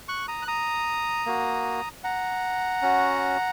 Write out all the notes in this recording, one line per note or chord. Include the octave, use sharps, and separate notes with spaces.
C#6 F#6
A#5 D#6
F#6
A#5 D#6
A#3 F#4
F#5 A#5
C#4 F#4